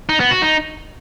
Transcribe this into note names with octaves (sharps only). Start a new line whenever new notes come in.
D#4
B3
F#4
D#4